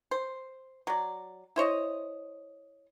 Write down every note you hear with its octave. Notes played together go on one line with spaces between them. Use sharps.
C5
F#3 D5
E4 C5 C#5 D#5